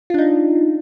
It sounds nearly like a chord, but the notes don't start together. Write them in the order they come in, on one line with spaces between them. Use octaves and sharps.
F4 D4 D#4